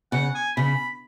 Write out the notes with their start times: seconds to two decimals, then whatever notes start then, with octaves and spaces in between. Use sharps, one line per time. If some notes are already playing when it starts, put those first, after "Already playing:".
0.12 C#3 F#5
0.35 G#5
0.57 C#3 B5